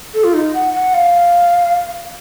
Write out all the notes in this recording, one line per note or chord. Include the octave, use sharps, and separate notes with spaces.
A4
F4
D#4
F#5
F#5
F5